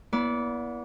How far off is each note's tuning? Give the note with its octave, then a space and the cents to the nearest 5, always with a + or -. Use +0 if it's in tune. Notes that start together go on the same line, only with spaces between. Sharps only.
B3 -40 E4 +0 D5 -25